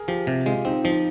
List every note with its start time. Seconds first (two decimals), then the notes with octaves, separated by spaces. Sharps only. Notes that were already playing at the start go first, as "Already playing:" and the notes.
Already playing: G#4 A#4
0.08 F3 G4
0.27 C3 G4
0.46 G#3 F4
0.65 C4 D#4
0.84 F3 D#4